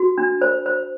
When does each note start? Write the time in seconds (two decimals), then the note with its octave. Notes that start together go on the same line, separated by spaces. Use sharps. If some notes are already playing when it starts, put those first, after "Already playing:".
Already playing: F#4
0.18 D4
0.41 C5
0.66 C5